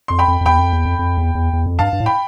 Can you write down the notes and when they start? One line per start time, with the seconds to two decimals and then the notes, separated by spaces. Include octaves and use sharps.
0.08 F2 C6
0.19 G5 B5
0.28 F2
0.41 F2
0.46 E2 G5 B5
0.59 F2
0.73 E2
0.85 F2
0.99 F2
1.17 E2
1.35 E2
1.53 E2
1.66 F2
1.79 G2 F5 A5
1.93 G2
2.00 A2
2.06 G5 B5